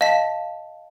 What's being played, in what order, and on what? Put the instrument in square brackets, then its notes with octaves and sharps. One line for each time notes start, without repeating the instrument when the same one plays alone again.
[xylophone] D#5 A5 B6 [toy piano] F5